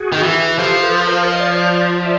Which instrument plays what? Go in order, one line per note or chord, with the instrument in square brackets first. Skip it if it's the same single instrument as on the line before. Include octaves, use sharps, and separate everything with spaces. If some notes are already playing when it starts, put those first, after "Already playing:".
Already playing: [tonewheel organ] F#4 G#4
[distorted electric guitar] D#3
E3
[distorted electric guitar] F3 [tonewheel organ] G4 A4
[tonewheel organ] A4 B4
A#4 C5
D#5
D5
C#5
C5 D5
D5 E5